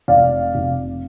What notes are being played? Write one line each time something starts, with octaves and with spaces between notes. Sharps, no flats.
F1 D5 F5
F1